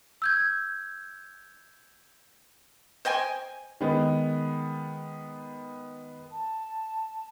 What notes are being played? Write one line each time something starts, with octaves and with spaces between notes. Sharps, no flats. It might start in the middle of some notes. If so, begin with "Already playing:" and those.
E6 G6 G#6
C5 D#5 G5 G#5
D#3 G#3 B3
A5